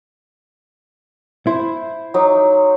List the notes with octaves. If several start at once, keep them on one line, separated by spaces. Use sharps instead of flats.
E4 C5
F#3 D#4 D6